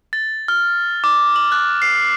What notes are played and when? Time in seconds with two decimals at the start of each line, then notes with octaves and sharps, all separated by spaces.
0.13 A6
0.48 F6
1.04 D6
1.36 F#7
1.52 F#6
1.82 C7